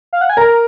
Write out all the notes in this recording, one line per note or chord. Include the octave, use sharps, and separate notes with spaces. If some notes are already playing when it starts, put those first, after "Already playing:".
F5
F#5
G#5
A#4 A#5